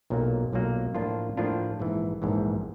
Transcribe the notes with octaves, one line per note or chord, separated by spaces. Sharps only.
B1 A#2 F#3 A#3
B1 A#2 F#3 A#3
A2 F3 A#3 D4 F4
A2 F3 A#3 D4 F4
A#1 G#2 E3
A#1 G#2 E3